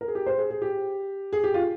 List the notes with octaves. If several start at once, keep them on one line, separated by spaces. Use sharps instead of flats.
A#4
G#4
G4
C5
G#4
G#4
G4
G#4
G4
F4